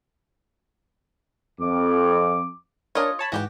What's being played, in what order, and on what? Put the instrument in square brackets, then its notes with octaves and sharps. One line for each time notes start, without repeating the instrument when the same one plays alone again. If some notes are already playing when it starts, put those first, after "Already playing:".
[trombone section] F2 [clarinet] D6
[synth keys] D4 A#4 C#5 [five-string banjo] F4 D#5
[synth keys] C#5 A5 B5
[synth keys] G#2 E3 [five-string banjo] F#4 G4 G5